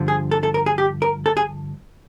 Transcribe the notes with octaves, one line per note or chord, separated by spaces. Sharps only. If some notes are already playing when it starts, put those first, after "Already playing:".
Already playing: G2 D3 F3
G#4
A4
A4
A#4
G#4
G4
A#4
A4
G#4